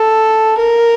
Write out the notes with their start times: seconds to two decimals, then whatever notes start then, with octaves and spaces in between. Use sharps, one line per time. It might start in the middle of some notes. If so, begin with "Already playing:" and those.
Already playing: A4
0.59 A#4